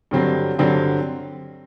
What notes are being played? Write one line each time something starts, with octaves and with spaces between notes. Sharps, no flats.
G2 D3 F#3 C4
G2 D3 F#3 C4